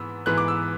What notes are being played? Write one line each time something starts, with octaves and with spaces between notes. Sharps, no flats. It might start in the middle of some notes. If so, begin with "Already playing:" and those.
Already playing: G#2 E3 B3 E6
G#2 E3 B3 F#6
D6
E6